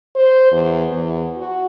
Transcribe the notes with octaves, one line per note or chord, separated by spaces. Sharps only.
C5
E2
E2
F#4